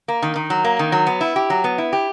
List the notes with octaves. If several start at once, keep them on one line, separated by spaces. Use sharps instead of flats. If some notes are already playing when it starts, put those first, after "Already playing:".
A#3
D#3
D#3
F#3
A#3
D#3
F#3
B3
E4
G4
F#3
B3
E4
G4